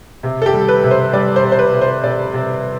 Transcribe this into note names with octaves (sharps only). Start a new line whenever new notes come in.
C3
A4
G4
G3
B4
C3
C5
G3 D5
C5
C3
C5
B4
C3
C5
C3 D5
C3